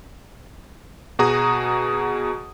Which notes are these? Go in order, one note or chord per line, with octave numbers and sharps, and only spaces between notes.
B2 F#4 G#4 A#5 D#6